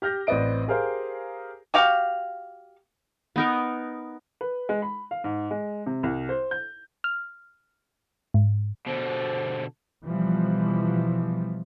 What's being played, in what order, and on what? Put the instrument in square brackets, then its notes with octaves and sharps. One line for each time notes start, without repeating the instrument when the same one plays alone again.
[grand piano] G4 F6 G6 A#6
A1 C4 B4 D5 D#5 D7
G4 G#4 A#4 C5 F5
[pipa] F#4 G4 F5
[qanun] B3 D#4 A#4
[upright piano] B4
G#3
B5
F5
G#2
G#3
C3
C2
C5
G6
[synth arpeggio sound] F6
G#2
[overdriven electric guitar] B2 D3 [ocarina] C5
[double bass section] B2 E3 F3 G3